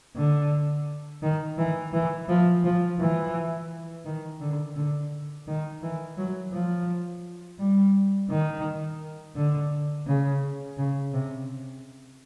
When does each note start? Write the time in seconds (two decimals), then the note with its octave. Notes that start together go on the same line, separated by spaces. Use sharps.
0.16 D3
1.22 D#3
1.58 E3
1.93 E3
2.28 F3
2.64 F3
2.99 E3
4.05 D#3
4.40 D3
4.76 D3
5.47 D#3
5.82 E3
6.17 F#3
6.53 F3
7.59 G3
8.30 D#3
9.36 D3
10.07 C#3
10.78 C#3
11.13 C3